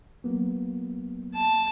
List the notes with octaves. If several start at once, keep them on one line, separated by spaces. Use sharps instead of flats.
F#3 A#3 B3
A5